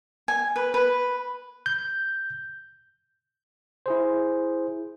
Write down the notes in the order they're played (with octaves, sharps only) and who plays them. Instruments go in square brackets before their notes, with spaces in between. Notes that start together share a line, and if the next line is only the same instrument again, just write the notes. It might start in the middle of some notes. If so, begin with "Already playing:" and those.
[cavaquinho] G#5
B4
B4
[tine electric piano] G6
E4 G#4 C5